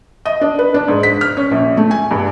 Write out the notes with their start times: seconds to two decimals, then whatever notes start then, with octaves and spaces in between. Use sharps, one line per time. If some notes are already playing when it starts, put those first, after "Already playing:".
0.26 D#5
0.41 D4
0.59 B4
0.74 D4
0.88 G#2
1.03 B6
1.21 F6
1.37 C#4
1.51 A#1
1.77 A3
1.91 G#5
2.11 G2